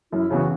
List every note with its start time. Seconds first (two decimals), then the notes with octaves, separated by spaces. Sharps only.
0.12 F#2 E4
0.30 C#3 E3 B3 F#4